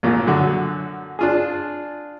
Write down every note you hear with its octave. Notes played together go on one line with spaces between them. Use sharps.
A1 A#2
F#2 D3 F#4
D4 F4 G#4